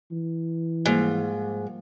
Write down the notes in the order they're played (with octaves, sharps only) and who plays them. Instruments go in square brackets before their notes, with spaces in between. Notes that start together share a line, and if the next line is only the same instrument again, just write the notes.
[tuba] E3
[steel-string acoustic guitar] G#2 [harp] F3 G3 A#3